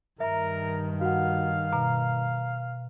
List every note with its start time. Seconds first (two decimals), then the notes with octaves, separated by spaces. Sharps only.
0.20 G2 D#3 A#4 E5 A#5
1.01 F#4 F5 F#5
1.73 B2 A#5